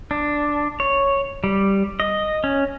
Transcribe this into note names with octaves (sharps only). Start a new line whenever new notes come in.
D4
C#5
G3
D#5
C#4